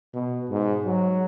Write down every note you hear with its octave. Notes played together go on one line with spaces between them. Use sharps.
B2
G#2
F#3